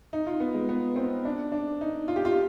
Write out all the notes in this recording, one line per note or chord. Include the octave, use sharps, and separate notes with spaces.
D#4
F4
B3
G#3
B3
C4
D4
D4
D#4
F4
G4
F4